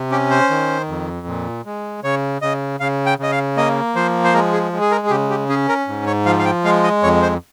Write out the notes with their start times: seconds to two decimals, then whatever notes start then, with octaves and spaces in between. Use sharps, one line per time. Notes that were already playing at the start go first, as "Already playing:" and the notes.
Already playing: C3
0.11 C#4 G4
0.30 C5
0.50 D#3
0.88 F2
1.27 A#2
1.66 G#3
2.03 C#3 C#5
2.42 C#3 D#5
2.80 C#3 F5
3.06 G5
3.19 C#3 D#5
3.32 F5
3.57 A#3 D#5
3.96 F3 C5
4.24 C5
4.34 G#3 A#4
4.53 G#4
4.72 G#3
4.81 G#4
4.91 A#4
5.07 G#4
5.10 C#3 G4
5.30 G4
5.49 C#4 G#4
5.69 A#4
5.88 G#2
6.07 C#5
6.26 F3 F5
6.39 F5
6.45 G5
6.64 G#3 F5
6.84 D#5
7.03 F2 C#5
7.22 C5